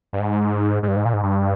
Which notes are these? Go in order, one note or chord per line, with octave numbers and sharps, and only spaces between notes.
G2
G#2
G#2
G2
G#2
A#2
G#2
G2